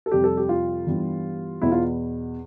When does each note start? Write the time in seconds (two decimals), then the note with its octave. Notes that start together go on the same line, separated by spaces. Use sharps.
0.06 A4
0.11 F2 C3 G3 G4
0.24 A4
0.37 G4
0.49 F4
0.87 G2 E3 G3 B3
1.62 E2 B2 B3 E4
1.72 F4